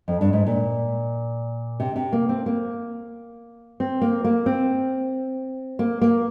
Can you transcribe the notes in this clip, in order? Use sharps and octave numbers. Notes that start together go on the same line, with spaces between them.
F2
G2
G#2
A#2
C3
C3
A#3
C4
A#3
C4
A#3
A#3
C4
A#3
A#3